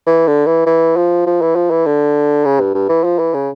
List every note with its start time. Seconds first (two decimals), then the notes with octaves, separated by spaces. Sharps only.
0.06 E3
0.27 D3
0.46 E3
0.66 E3
0.97 F3
1.26 F3
1.41 E3
1.56 F3
1.71 E3
1.86 D3
2.45 C#3
2.60 G2
2.74 G2
2.89 E3
3.04 F3
3.19 E3
3.34 C#3